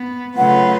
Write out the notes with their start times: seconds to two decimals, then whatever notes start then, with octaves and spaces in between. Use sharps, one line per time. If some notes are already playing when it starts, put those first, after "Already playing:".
Already playing: B3
0.36 C#3 F#3 A3 F4 B4 F#5